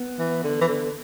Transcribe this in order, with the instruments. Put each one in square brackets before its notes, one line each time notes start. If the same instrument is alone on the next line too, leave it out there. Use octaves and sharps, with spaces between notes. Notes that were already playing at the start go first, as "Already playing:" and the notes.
Already playing: [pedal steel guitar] B3
[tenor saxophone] E3
D3
E3
D3